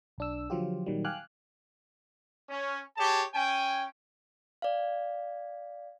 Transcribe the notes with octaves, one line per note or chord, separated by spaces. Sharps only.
B1 D4 E6
D3 F3 F#3 F4 G4
A#2 D#3 F#3 G3
F5 G5 G#5 D6 F6 F#6
C#4
G4 G#4 C#5 A5
C#4 G5 G#5
D5 F5